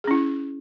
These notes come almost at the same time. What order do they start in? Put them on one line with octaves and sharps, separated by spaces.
G#4 C#4 E4